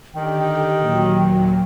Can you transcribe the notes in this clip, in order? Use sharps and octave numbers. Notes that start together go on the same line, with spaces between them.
D3 D#3 G4 G5
D#2 A#2 F#3